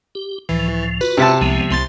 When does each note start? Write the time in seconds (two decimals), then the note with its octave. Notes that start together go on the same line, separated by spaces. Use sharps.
0.15 G4
0.49 C#2 A2 E3 F3
1.01 F4 F#4 B4
1.17 C3 E5 A5
1.41 C2 F3 G#3 B3
1.70 C2 C6 A6